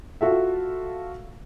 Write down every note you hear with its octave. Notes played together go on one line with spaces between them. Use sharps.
F4 F#4 A4 E5